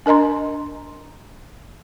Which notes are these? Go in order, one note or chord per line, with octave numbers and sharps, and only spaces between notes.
D4 A#4 D#5 A#5 C6